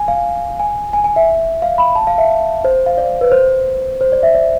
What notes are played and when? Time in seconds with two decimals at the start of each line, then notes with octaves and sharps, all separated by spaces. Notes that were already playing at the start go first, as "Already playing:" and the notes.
Already playing: G#5
0.08 F5
0.60 G#5
0.93 G#5
1.04 G#5
1.16 E5
1.62 F5
1.78 B5
1.95 A5
2.07 F5
2.18 E5
2.65 C5
2.86 F5
2.98 D5
3.21 B4
3.32 C5
4.01 C5
4.12 D5
4.23 E5
4.34 D5